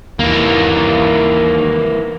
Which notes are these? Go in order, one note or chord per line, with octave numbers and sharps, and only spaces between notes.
D#2 E3 A#3